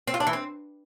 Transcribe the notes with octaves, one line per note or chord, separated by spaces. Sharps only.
C4
F4
D4
E3
C4